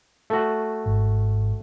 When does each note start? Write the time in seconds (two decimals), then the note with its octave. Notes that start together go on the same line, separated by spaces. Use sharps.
0.30 A3 F#4
0.86 G#1